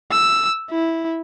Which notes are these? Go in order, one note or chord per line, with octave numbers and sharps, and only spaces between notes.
E6
E4